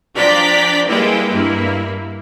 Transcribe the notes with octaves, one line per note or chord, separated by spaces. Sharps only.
F3 D4 D5 G5 A#5 B6
G3 G#3 A#3 E4 B4 G5
G2 A#3 E4